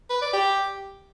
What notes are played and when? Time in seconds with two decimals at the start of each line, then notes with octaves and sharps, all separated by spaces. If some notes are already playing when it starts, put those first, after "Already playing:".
0.10 B4
0.22 D5
0.33 G4